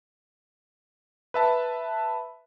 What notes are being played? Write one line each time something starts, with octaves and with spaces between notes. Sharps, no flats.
B4 E5 A5